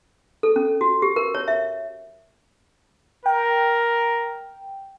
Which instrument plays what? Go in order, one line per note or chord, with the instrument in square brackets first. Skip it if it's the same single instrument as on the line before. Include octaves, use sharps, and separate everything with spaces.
[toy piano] A4
C#4
F#4
G4
A#4
C#5
E5
[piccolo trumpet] A#4 [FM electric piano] G5